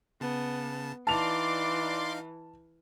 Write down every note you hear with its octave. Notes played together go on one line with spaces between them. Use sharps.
C#3 B3 A5
E3 D#4 D5 F5 A5 C6 D6 F7